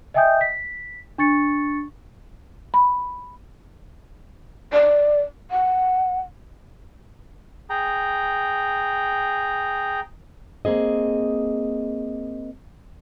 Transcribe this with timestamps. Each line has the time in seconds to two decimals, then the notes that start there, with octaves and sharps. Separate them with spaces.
0.14 D#5 E5 G5 G#5 D#6 G6
0.41 B6
1.18 D4 C#6 A6 C#7
2.74 B5
4.73 D5
5.51 F#5
7.70 G#4 G5 A#5
10.65 A#3 C4 G#4 D#5